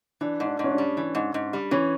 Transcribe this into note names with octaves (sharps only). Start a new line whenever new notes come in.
E3 D4
G#2
D4
G#2
C#4
D4
G3
E3
G#2
G#2
G3
E3 C#4